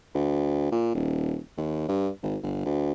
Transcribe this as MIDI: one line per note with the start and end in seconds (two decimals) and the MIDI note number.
0.15 0.69 38
0.72 0.93 46
0.95 1.38 27
1.57 1.85 39
1.89 2.09 43
2.23 2.37 32
2.43 2.61 31
2.65 2.92 38